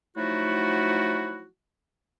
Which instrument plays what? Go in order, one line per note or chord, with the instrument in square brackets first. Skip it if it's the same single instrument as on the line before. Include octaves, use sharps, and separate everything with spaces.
[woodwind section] F3 F#3 A3 D#4 E4 F#4